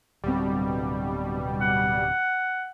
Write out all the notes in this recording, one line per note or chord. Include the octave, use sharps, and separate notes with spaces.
D1 B2 G3 C4
F#5